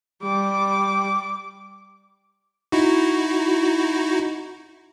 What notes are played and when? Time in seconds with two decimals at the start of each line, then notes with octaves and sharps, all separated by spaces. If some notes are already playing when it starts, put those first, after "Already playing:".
0.23 G3 D6
2.72 D#4 E4 F#4